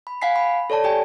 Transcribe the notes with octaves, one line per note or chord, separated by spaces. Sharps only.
B5
F5 F#5 G#5 B6 C7
B5
A4 C#5 D5 A5
G4 D5 G5 G#5